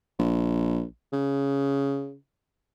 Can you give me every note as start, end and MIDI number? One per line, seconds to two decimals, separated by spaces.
0.19 0.83 34
1.13 2.15 49